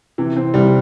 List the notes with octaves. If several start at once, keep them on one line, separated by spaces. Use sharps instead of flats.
C3 E3
C4
C2 G3